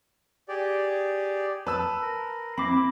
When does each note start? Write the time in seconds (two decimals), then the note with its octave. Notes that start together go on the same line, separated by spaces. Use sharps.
0.49 G4 G#4 D5
1.67 B4 A5 E6
2.02 A#4
2.58 C4 E4 B5 D6 A#6